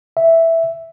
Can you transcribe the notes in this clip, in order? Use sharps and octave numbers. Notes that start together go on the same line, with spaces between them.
E5